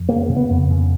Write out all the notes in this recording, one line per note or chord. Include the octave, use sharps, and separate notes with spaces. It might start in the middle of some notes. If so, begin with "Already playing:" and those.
Already playing: F2
C#3 A#3
C#3
B3
F2
C#3